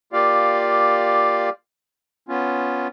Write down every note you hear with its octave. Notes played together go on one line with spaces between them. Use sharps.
A#3 F4 G4 D5 F5
B3 C#4 F4